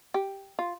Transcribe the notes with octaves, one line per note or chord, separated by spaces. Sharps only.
G4
F4